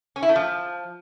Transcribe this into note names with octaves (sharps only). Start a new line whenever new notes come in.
C#4
E4
A3
F3